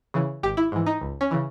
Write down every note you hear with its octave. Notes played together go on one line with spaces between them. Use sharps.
C#3 E3
G#1 G4
E4
G#2 E3
D#4
C#2
C#4
C#3 E3